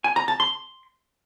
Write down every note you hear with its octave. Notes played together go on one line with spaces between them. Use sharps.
G#5
A#5
A5
C6